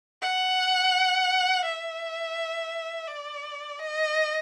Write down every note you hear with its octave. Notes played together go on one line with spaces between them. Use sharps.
F#5
E5
D5
D#5